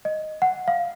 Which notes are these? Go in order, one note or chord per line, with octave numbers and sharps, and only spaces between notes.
D#5
F#5
F5